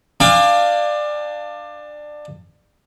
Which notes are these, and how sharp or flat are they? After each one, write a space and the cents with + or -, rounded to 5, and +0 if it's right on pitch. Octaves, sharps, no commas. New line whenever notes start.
D4 +20 F5 +0 G#5 -40